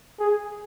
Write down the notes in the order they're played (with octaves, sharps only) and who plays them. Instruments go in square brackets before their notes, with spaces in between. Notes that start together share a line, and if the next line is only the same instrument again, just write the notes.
[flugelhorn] G#4